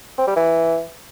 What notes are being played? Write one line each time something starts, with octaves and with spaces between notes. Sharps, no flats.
C4
G3
E3